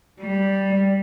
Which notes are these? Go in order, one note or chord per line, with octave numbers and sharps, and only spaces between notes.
G3